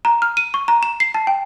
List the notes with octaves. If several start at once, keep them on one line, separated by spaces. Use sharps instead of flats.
A#5
F6
D#7
C#6
A#5
E7
C7
A5
G5